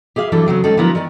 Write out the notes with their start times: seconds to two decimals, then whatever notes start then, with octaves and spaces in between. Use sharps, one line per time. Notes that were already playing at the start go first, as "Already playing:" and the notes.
0.16 G4 G#4 E5 F5
0.32 E3 F#3 D4 E4 G4 A4
0.46 C#3 F#3 A3 C4
0.64 D#3 G#3 C#4 D#4 G4 A4
0.77 D3 F3 F#3 B3 E4 A#4
0.95 D#3 D5 G#5